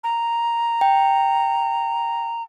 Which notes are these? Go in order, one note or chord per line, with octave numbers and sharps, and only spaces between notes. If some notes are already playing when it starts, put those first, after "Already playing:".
A#5
G5